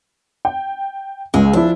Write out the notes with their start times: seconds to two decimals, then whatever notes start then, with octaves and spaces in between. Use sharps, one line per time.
0.45 G5
1.34 C#2 G#3
1.53 F3 D4 E4